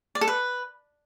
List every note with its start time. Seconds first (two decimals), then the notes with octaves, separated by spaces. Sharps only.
0.15 D5
0.21 A4
0.28 B4